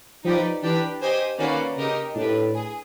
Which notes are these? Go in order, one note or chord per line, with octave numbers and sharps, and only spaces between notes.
F3 D#4 G4 B4 D5
E3 D4 G4 B4
G4 C5 D#5 G#5
D#3 A#3 C#4 F#4 B4 D5
C#3 D#4 G4 A#4 D#5
A2 D4 G4 B4
G#4